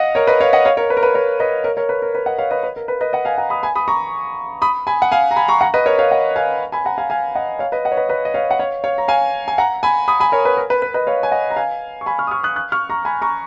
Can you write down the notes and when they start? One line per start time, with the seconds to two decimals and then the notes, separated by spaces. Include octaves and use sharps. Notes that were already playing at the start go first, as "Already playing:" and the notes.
Already playing: D#5 F5 F#5
0.15 A#4 C#5
0.27 B4 D#5
0.40 C#5 F5
0.53 D#5 F#5
0.65 C#5 F5
0.77 A#4 C#5
0.90 B4
0.97 A#4
1.03 B4
1.15 A#4 C#5
1.40 B4 D#5
1.64 A#4 C#5
1.77 A#4 C#5
1.89 B4
2.02 A#4
2.15 B4
2.26 D#5 F#5
2.38 C#5 F5
2.51 B4 D#5
2.63 B4
2.76 A#4
2.88 B4
3.01 B4 D#5
3.13 D#5 F#5
3.25 F5 G#5
3.38 F#5 A#5
3.50 B5 D#6
3.63 G#5 B5
3.75 B5 D#6
3.88 A#5 C#6
4.62 B5 D#6
4.87 G#5 B5
5.02 F#5
5.12 F5 G#5
5.31 A#5
5.36 G#5 B5
5.48 A#5 C#6
5.61 F#5 A#5
5.74 B4 D#5
5.86 A#4 C#5
5.98 C#5 F5
6.11 D#5 F#5
6.36 F5 G#5
6.72 G#5 B5
6.85 F#5 A#5
6.98 F5 G#5
7.10 F5 G#5
7.35 D#5 F#5
7.59 C#5 F5
7.72 B4 D#5
7.85 D#5 F#5
7.92 C#5
7.97 B4 D#5
8.09 B4 D#5
8.25 D#5
8.34 C#5 F5
8.51 F#5
8.59 C#5 F5
8.84 C#5 F5
8.98 A#5
9.08 F5 G#5
9.48 G#5
9.58 F#5 A#5
9.83 G#5 B5
10.08 B5 D#6
10.20 G#5 B5
10.32 A#4 C#5
10.45 B4
10.57 A#4
10.70 B4
10.82 B4
10.94 B4 D#5
11.07 C#5 F5
11.23 G#5
11.32 D#5 F#5
11.50 A#5
11.56 F5 G#5
12.01 C#6
12.06 G#5 B5
12.18 C#6 F6
12.27 D#6
12.31 C#6 F6
12.43 D#6 F#6
12.56 D#6 F#6
12.72 C#6 F6
12.90 A#5 C#6
13.05 G#5 B5
13.22 A#5 C#6